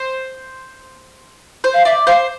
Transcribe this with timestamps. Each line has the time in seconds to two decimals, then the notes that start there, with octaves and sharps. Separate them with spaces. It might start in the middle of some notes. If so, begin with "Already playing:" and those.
Already playing: C5
1.64 C5
1.74 F5
1.85 D5 E5
2.07 C5 F5